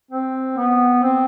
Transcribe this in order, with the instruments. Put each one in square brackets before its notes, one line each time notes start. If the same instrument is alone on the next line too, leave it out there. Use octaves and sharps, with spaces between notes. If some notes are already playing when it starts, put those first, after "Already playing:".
[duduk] C4
B3
C4